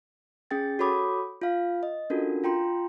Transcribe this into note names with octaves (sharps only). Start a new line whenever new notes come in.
C#4 G#4 G5 A6
F#4 A4 C#5 B5 D6 D#6
F4 F5
D#5
C#4 D4 F4 F#4 A4 A#4
F4 G5 A#5 C6